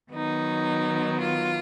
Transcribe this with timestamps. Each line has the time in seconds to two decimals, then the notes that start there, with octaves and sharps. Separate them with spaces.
0.12 D#3 F#3 B3 D#4
1.19 F4